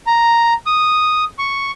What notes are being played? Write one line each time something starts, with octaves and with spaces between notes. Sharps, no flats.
A#5
D#6
C#6